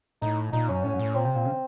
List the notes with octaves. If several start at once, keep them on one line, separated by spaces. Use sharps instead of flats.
A2 D#4
A#2 D#4
F#2 C#4
A2 C#4
F#2
A2
A#2 C4
C3
A#2
C#3